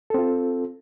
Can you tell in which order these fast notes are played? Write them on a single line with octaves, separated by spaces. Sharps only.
A4 C4 F4